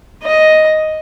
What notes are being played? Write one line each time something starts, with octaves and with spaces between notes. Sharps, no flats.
D#5